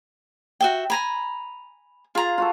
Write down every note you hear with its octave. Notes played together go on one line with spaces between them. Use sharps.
F#4 E5 G5
G#5 A#5 B5
F4 G#4 A#5
F4 F#4 A4